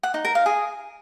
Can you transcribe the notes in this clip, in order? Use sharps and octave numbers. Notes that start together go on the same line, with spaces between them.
F#5
D#4
A#4
F5
G#4